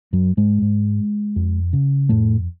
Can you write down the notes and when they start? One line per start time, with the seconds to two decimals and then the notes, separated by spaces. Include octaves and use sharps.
0.13 F#2 F#3
0.37 G#2 G#3
0.62 G#2
1.36 F2
1.73 C#3
2.09 F2 A2 A3